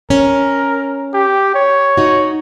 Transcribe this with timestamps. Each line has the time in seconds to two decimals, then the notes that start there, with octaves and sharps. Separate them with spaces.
0.10 C#4 A#4
1.14 G4
1.55 C#5
1.97 D#4 F#4